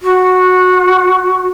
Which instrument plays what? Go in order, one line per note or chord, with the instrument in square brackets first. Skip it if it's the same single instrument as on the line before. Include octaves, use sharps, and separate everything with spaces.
[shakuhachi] F#4